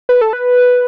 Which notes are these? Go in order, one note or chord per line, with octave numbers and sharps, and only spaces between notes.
B4
A4
B4